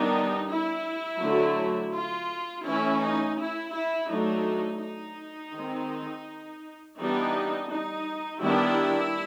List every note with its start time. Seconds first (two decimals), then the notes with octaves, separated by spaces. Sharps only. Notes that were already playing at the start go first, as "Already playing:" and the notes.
Already playing: D#3 G3 B3 D4 D#4
0.49 E4
1.21 D3 F#3 A3
1.92 F4
2.64 E3 A3 C#4 E4
3.01 D#4
3.37 E4
3.73 E4
4.08 F#3 A3 D4 D#4
4.80 D#4
5.53 D#3 G#3 C4
6.98 E3 G3 B3 D4 D#4
7.70 D#4
8.41 D#3 G3 B3 D4 E4